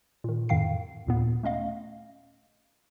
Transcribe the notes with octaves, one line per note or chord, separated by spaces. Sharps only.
A#2 D#3
F2 A2 D#3 F5 G5 C7
D#2 A#2 B3
A3 C#4 D#5 F5